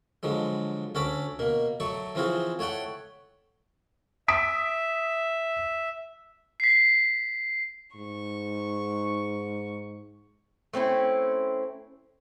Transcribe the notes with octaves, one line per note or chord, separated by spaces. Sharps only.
D3 F3 F#3 G#3
D2 C#4 F#4 A4 B5 D6
B2 A#3
F#3 A3 D5 C#6
E3 F3 C4 F4 F#4 G#4
A3 C#5 D5 F#5 G5
E5 D#6 B6 D7
B6 C7
G#2 C#6
A3 C4 C#4 E4